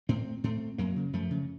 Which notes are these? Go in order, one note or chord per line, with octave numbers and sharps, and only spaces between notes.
A2 A3 C4
A2 A3 C4
F#2 F#3 A#3
C#3
F#2 F3 A3
C#3